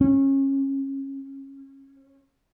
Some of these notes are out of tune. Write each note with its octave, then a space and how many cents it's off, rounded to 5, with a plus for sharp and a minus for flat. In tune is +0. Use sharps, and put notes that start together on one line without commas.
C#4 -25